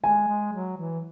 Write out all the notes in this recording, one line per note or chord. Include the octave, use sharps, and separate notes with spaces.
G#3 G#5
G#3
F#3
E3